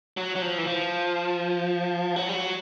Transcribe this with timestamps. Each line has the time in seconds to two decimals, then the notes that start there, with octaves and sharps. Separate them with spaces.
0.17 F#3
0.36 F#3
0.42 F3
0.58 E3
0.67 F3
2.16 F#3
2.29 G3
2.34 F#3